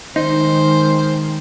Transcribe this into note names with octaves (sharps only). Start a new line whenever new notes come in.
D#3 G#3 D#4 C5